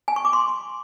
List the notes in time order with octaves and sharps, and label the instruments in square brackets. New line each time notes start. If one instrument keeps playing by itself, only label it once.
[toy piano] G#5
C#6
D6
C6